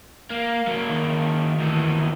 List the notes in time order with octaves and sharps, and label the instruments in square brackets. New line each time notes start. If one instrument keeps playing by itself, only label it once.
[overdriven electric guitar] A#3 [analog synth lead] F5
[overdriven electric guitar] F#3 A#3
[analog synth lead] D#3
[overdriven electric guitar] D2 E3